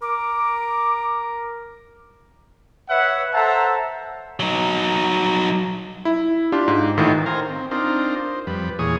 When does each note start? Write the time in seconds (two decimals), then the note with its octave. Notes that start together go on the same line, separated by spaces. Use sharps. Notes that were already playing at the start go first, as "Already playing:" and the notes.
0.02 A#4 D6
2.89 B4 C#5 E5 F#5
3.34 A4 C5 E5 F#5 A5 A#5
4.40 F#3 D#4
6.05 E4
6.52 D4 F4 G4
6.68 G#2
6.97 A1 A2 D#3
7.26 C5 F5 G#5 A#5
7.49 C4
7.71 C4 D4 D#4 F4 A#4
8.16 C5
8.47 F2 G3 B4
8.79 E2 A#2 G#4 C#5 D#6